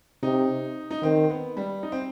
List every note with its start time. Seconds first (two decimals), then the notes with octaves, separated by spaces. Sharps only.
0.23 C3 D#4
0.91 D#4
1.02 D#3 C4
1.30 B3
1.57 G3
1.83 D#4
1.92 C4